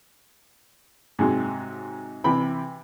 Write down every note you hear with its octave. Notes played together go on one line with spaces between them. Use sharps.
G#2 C3 F#3 G#3
C3 E3 G5 B5